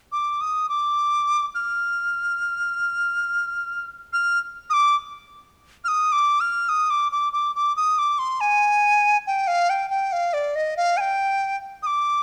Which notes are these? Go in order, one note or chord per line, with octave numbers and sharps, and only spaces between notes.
D6
D#6
D6
F6
F6
D#6
D6
F6
D#6
D6
F6
D#6
D6
D6
D6
D6
D#6
D6
C6
G#5
G5
F5
G5
G5
F5
D5
D#5
F5
G#5
G5
D#6
D6